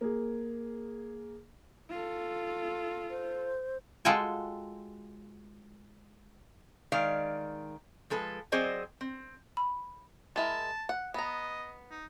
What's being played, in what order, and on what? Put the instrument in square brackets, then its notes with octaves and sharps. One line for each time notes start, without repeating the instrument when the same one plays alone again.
[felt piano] A#3 G#4
[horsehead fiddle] F4 A4
[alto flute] C5
[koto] G#3 F4 F#4 A4 G5 G#5
[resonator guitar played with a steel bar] D#3 G#3 D5 F5
F3 G#3 A4 B4
F#3 C4 G#4 C5 D5 D#5
C4
[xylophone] B5
[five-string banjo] G#3 E4 A#4 [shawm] A5
[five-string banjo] F#5
[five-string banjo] B3 A#5 [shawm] D#5
[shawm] D#4